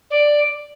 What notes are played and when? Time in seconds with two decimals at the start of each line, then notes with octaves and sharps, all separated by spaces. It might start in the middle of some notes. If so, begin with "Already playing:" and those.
0.11 D5